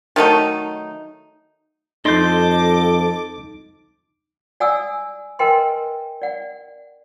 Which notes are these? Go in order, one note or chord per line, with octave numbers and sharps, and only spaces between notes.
D#3 F#3 A3 D#4
F2 D#4 A4 D#5 C6 D6 G6
D5 F#5 G#5 D#6 E6
A#4 B4 D#5 G5 G#5 C6
D5 F#5